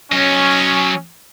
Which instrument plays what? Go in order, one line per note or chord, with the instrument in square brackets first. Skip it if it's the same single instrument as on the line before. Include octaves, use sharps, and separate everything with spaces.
[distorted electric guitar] F#3 D#5 [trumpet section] C#4